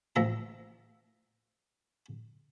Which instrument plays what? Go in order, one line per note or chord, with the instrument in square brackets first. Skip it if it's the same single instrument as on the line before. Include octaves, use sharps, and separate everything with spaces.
[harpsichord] A1 F3 E5 A#5